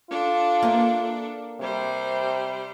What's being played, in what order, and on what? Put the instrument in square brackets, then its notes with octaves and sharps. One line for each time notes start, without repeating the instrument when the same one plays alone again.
[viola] D4 A4 [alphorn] F4
[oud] A#3 B4 E5
[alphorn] C3 [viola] G3 C5